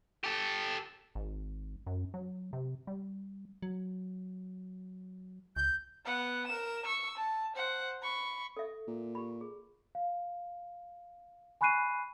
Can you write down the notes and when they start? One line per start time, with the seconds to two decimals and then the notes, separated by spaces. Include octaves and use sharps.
0.24 G4 A4
1.15 G#1
1.87 F#2
2.14 F#3
2.53 C3
2.87 G3
3.62 F#3
5.56 C#2 G6
6.05 B3 F#5
6.47 A#4 E7
6.86 C#6 E6
7.18 A5
7.56 C5 F#5
8.03 B5 C#6
8.57 A4 E5
8.88 A#2
9.15 G4 B5
9.41 G#4
9.95 F5
11.61 G#5 B5 C#6 F#6 C7 D#7